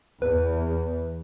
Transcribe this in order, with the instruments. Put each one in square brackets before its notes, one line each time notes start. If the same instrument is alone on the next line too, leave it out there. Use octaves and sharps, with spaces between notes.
[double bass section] E2 [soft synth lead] B4